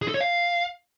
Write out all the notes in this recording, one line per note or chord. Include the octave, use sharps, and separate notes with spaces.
G#4
A4
C#5
F5